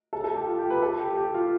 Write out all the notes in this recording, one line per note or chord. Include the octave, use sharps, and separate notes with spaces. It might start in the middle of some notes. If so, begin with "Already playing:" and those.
A4
A4
G4
F4
G4
B4
A4
G4
G4
F4